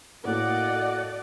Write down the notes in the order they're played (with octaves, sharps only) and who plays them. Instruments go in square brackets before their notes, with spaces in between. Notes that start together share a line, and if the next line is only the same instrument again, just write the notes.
[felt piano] A2 A#3 F#4 [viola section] A4 D5 D#5 [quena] F#5